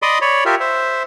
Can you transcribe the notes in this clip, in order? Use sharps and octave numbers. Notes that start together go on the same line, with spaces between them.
D5 D#5 B5 C6 D6 D#6
C#5 D5 B5
F4 G4 A#4 E5
C5 E5